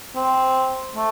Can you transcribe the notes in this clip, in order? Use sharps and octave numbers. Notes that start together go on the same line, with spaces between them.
C4
A3